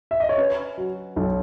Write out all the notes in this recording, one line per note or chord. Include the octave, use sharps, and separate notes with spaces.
E5
D#5
C#5
C#4 B4
F#3
B1